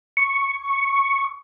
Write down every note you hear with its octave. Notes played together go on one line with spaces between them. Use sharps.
C#6